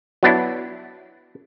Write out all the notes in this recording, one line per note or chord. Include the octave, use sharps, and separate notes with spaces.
F#3 B3 D4 E4